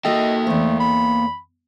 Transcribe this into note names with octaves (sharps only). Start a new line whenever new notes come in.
A#3 F#4 A4 D#5 E5 G5
E2 A3 C5
B5